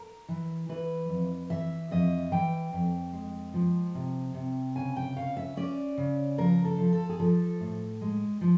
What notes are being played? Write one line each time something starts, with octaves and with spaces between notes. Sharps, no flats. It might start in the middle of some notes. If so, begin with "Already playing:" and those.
Already playing: A#4
E3
E3 B4
F2
E3 E5
F2 D#5
E3 G5
F2
G#3
F3
C3
C3
C#3 G#5
G5
C#4 F5
E5
C#4 D5
C#3
F3 A#4
A4
F3
A4
G#4
F3 A4
A2
G#3
F3